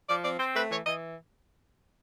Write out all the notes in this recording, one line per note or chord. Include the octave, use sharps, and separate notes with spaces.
F3 D5
C4 D5
C4 C5
A3 B4
E3 C#5
E3 D#5